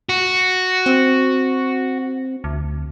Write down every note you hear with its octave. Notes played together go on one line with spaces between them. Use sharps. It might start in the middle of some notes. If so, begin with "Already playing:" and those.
F#4
C4
D2